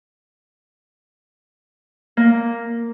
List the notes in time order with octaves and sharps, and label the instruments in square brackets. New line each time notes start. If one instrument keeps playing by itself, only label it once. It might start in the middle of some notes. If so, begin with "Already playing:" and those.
[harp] A#3